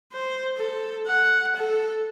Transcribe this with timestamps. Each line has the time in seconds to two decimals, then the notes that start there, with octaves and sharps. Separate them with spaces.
0.13 C5
0.58 A4
1.07 F#5
1.56 A4